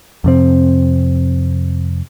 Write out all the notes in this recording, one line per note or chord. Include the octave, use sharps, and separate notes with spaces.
F2 C3 C4